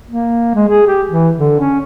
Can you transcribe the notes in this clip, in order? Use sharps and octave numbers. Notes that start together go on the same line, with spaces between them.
A#3
G#3
G#4
G4
E3
D3
C#4